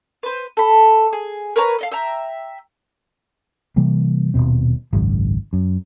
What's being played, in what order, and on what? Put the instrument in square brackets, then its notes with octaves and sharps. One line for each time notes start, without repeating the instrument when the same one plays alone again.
[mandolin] B4 C5
A4 B5
G#4
A#4 B4 C#5 A#5
A4 D#5 F5
E5 G5 A#5
[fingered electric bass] C3 E3 G3 A#3
D#1 C#2 B2 C4
G#1 C#2 F#2
F#2